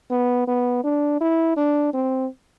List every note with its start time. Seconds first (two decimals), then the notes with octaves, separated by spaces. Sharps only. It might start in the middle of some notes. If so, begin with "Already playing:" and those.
0.11 B3
0.47 B3
0.84 D4
1.21 E4
1.57 D4
1.94 C4